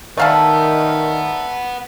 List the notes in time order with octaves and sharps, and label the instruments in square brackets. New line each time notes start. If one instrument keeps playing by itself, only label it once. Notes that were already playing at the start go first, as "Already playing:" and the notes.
[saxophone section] D#3 [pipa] A3 F5 A5 [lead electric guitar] B4 F#5 [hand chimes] D5 A#5